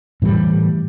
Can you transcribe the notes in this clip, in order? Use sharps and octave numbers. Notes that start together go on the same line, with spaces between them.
A2 E3 F#3 G3